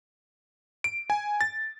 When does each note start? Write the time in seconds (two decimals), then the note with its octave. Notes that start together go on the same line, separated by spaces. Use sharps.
0.84 D7
1.10 G#5
1.41 A6